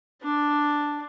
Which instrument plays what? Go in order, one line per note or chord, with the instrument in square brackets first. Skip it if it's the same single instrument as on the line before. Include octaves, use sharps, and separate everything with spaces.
[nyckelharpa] D4 D5